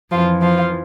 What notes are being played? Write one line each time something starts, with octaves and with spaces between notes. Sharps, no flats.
F2 E3 F3 F4
F3 F4